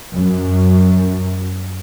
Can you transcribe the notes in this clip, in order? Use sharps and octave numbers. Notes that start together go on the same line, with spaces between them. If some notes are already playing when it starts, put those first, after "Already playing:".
F#2